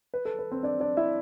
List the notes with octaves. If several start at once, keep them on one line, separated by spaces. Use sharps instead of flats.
B4
A4
B4
C4 C5
D4 D5
D4 D5
E4 E5